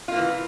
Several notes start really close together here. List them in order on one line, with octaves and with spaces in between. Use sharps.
F4 A#3 E3